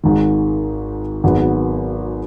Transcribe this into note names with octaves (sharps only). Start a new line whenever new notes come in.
G#1 G#2 D#3
G#1 G#2 F#3 B3